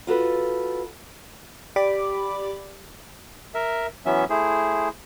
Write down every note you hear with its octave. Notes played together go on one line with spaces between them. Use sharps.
F4 F#4 A4 B4
G4 D5 B5 D6
A#4 E5
E3 F#3 B3 C#4 E5
A3 E4 G#4 C5